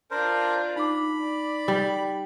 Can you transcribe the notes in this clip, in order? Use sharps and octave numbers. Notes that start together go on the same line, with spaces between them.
D4 F4 A#4 C5
D#4 B5 D6
D5
G3